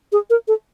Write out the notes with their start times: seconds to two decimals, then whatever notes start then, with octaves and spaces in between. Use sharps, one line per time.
0.12 G#4
0.30 A#4
0.48 A4